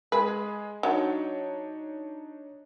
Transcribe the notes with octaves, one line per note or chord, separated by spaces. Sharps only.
G#3 G#4 B4
F#3 D4 D#4 C#5